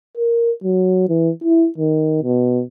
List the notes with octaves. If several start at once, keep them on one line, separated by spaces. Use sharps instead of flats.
A#4
F#3
E3
E4
D#3
B2